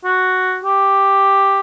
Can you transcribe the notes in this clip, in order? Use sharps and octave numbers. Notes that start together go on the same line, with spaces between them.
F#4
G4